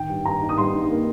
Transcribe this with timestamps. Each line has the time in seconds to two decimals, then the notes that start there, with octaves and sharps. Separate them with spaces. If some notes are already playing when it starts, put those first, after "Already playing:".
Already playing: D#3 G5
0.09 G2
0.25 G2 A#5
0.42 D#4
0.49 D#6
0.58 G2 C6
0.74 D#4
0.90 A#3